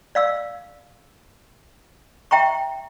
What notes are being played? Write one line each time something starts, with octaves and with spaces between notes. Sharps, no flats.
D5 F5 E6
E5 G5 A#5 C#6